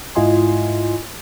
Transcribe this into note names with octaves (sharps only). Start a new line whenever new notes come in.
G#2 E4 F4 D#5 G#5 C6